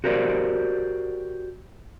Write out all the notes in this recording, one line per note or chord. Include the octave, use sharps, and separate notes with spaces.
F#4 G4 A#4 C5 D5